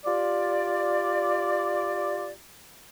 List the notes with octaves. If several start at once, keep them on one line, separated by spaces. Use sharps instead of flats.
F4 G4 D5